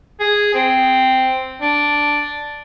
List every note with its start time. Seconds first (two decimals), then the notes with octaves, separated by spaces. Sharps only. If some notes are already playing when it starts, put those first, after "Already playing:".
0.20 G#4
0.54 C4
1.62 D4